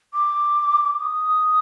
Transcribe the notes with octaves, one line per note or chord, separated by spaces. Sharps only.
D6
D#6